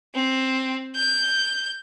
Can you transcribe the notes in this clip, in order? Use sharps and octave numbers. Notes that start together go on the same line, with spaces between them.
C4
G6